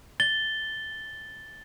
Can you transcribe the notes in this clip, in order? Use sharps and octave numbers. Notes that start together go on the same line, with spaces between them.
A6 G7